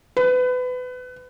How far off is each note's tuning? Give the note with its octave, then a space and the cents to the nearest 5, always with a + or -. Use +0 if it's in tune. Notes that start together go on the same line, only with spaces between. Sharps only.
B4 +25